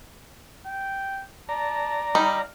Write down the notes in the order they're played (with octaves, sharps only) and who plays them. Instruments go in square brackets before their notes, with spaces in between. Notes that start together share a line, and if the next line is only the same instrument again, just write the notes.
[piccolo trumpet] G5
[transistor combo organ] D5 A#5 [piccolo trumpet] A5
[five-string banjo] G3 D#4 [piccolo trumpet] F5